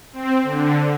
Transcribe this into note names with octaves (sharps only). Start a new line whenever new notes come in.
C4
D3